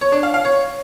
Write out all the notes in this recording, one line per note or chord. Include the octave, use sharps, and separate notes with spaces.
C#5
D4
F5
F5
C#5